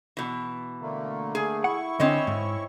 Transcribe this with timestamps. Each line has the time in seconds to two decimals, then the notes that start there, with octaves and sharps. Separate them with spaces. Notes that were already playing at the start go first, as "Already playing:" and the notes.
0.17 B2 E3
0.82 D3 A3 A#3
1.35 G#4
1.64 E4 F#5 C#6
2.00 D3 C4 C#4 D#5
2.27 G#2